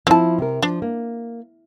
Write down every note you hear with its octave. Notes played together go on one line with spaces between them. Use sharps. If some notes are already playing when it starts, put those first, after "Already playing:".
F3 C4 E4 A5
C3 A#4
F3 D4
A#3